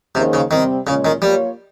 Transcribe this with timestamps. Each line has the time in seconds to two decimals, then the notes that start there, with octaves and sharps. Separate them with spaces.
0.15 C3 D#3 A#3 C#4 G#4 C5
0.33 C#3
0.50 C3 D#3 G3 C4
0.87 A#2 C#3 G#3 C#4
1.05 D#3
1.21 G3 A#3 F4 A#4 C#5